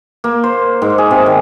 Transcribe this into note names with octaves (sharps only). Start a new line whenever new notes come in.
A#3
C5
G#2
G#4
C3
D#3